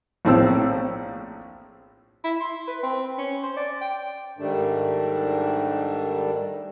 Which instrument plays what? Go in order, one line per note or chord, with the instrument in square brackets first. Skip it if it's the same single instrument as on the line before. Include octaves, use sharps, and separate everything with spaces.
[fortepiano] A#1 A2 C4 E6
[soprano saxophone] E4
C6
B4
C4
C#4
C5
D5
G5
[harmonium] G#2 D#3 G3 A3 D4